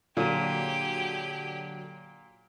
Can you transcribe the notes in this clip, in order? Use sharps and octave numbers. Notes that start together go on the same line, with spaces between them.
A#2 D3 F#3 G4 G#4 D#7